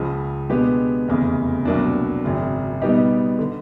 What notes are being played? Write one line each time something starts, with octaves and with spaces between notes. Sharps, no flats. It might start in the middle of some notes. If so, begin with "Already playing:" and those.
Already playing: C#2 C#3 F3
B2 G#3 B3 D4 G4
F1 E2 C#3
C2 B2 F#3 A#3 D4
G#1 F#2 C#3
B2 G3 B3 D#4 G4
D3